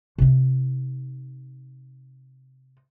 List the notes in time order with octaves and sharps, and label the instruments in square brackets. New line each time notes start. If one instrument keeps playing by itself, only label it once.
[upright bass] C3 D#4